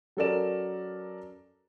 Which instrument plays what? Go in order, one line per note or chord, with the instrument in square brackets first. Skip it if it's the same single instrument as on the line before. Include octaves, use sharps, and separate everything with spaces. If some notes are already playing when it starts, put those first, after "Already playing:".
[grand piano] F#3 C#4 A4 A#4 D5 E7